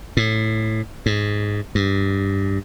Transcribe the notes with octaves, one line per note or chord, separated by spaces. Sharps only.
A2
G#2
G2